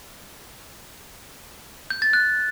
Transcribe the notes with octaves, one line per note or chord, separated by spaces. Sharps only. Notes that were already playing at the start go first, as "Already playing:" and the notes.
G6
A6
F#6